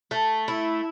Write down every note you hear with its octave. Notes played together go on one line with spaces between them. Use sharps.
A3
E4